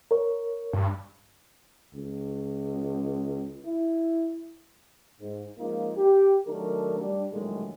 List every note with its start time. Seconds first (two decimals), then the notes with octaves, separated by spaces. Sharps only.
0.11 A#4 C#5
0.73 G2
1.94 C#2
3.65 E4
5.21 G#2
5.58 F3 G#3 A#3 C#4 D#4 F4
5.97 G4
6.47 D#3 F#3 A3 D4 A#4
6.99 G3 D4
7.32 A#1 A2 D#3 F#3 G#3